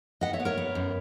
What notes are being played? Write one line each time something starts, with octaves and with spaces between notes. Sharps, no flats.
B3 D#5 F#5
C#5 E5
B3
A#4 C#5
B3
F#2